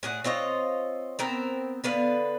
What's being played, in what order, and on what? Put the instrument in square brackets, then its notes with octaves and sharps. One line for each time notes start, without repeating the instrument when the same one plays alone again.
[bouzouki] A2 G#4 F#5
C4 F4 C#5 D#5
B3 C4 A#4
D3 B3 B4 F5